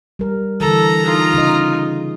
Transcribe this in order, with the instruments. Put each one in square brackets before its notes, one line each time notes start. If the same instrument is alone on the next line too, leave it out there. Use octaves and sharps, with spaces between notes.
[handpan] G3 A#4
[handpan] D3 E3 [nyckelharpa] A4 [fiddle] A#5
[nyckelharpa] D#4 F4
[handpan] C#3 D#5